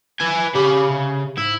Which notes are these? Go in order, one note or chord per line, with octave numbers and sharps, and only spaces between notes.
B4 G#5
C#3 G4 B5
C3
G#2 E4